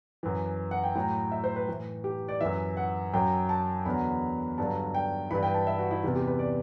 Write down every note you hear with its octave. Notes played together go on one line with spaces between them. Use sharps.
F#2 E3
F#5
G5
A2 F#3 G5
E5
C5
B4
A2 E3
G4
D5
F#2 E3 E5
F#5
F#2 F#3 G5
A5
E2 D3 F#3 B5
G2 D3 F#3 A5
G5
G2 E3 B5
G5
A5
E5
F#4
E4
E2 C3 E3
G4
B4
D5